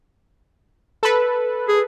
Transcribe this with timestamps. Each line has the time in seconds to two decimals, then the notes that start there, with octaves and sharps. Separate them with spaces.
1.03 A4 B4
1.69 G#4